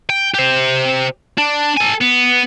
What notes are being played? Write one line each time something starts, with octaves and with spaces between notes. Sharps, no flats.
G5
G4 C5
D4
A4 G#5
B3